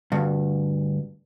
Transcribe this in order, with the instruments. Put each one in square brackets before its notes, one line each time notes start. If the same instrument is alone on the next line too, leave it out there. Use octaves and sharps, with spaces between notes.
[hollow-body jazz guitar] D2 G2